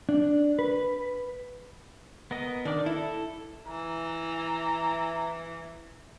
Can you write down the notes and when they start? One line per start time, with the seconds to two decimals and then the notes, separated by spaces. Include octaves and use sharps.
0.09 D4
0.59 B4
2.31 B3 A#4 D#5
2.65 D#3 D4 D5
2.86 E4 A4
3.67 E3 A#5